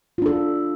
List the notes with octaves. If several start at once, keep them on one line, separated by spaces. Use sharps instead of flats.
D4 F4 A4